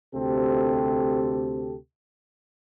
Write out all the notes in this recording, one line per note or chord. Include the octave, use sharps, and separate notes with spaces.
D2 C3 C4 G4 A4